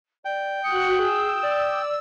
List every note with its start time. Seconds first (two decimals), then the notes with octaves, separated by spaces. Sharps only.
0.25 D5 G5
0.64 F#4 D#6 F#6 C#7
0.99 G#4 E6
1.43 D5